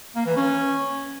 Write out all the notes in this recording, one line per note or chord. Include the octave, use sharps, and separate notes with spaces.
A#3
E3
C#4